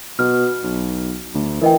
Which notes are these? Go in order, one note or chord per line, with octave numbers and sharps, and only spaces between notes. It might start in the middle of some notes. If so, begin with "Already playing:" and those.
B2 F6
B1
D2
E3 A#4 D#5 G5